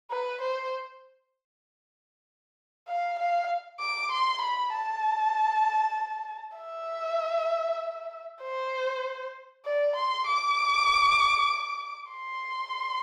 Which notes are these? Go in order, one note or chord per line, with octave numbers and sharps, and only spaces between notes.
B4
C5
F5
F5
D6
C6
B5
A5
E5
C5
D5
C6
D6
C6